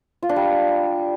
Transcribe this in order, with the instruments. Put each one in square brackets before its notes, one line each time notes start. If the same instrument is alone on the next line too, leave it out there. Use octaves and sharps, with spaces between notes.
[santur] F4
D4
G3